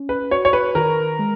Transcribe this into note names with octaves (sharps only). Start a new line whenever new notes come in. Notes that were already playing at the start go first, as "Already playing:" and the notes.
Already playing: C#4
B4
F#4 C#5
C#5
B4
D#3 A#4
G#3